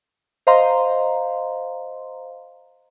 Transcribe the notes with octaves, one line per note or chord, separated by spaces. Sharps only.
C5 D#5 F5 A#5 C6